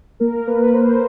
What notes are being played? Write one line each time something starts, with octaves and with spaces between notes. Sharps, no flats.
A#3 A#4
A#3 B4
A#3 C5